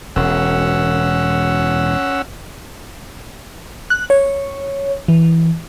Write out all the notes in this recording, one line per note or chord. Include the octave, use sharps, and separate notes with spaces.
E1 C#4 F#5 E6
F#6
C#5
E3